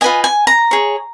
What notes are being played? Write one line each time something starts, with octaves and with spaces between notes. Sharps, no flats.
F4 B4 D#5 G#5
G#5
A#5
G#4 C#5